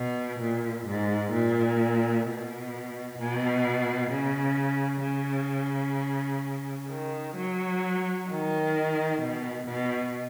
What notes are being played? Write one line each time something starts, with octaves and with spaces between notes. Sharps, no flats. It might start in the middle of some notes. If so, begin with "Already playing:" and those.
Already playing: B2
A#2
G#2
A#2
B2
B2
C#3
C#3
D#3
F#3
D#3
B2
B2